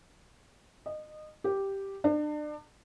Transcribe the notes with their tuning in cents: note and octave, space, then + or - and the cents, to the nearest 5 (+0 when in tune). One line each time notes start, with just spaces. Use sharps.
D#5 -20
G4 -5
D4 +35